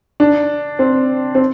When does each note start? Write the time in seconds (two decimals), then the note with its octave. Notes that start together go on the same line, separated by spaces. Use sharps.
0.20 D4
0.79 C4
1.35 C4